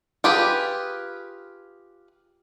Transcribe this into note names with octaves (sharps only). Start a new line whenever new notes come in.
F4 G4 G#4 B4